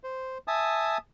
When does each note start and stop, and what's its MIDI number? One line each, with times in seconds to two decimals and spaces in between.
0.04 0.38 72
0.48 0.98 76
0.48 0.98 80
0.48 0.98 81
0.48 0.98 87